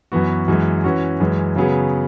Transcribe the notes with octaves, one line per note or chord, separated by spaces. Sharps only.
F#2 E3 B3 F#4
F#2 E3 G#3
E3 C#4 F#4
F#2 E3 G#3
C#3 F#3 B3 G#4